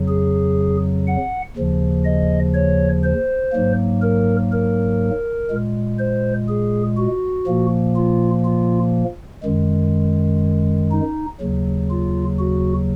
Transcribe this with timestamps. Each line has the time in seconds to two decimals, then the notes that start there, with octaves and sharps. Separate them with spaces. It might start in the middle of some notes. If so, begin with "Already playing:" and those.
Already playing: F2 C#3 F#3
0.08 G#4
1.07 F#5
1.57 D#2 C#3 F3
2.05 D#5
2.54 C#5
3.04 C5
3.53 G#2 F#3 A#3
4.02 A#4
4.52 A#4
5.50 A#2 G#3
5.99 C5
6.49 G#4
6.97 F#4
7.47 A#2 F3 A#3
7.96 F4
8.45 F4
9.43 F#2 D#3 G#3
10.92 D#4
11.41 D#2 C#3 F#3
11.90 F4
12.39 F#4